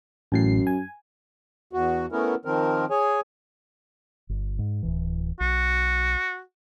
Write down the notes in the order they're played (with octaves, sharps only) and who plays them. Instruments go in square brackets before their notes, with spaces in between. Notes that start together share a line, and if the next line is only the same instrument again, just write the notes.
[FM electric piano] A1 A2 C7 [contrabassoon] F#2
[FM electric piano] G#5
[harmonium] E2 F#4
A3 B3 C#4 E4 A#4
D#3 F3 C4 A#4
G#4 C#5 G#5
[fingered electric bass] G1
G#2
D1 G1 E3
[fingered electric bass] B1 [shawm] F#4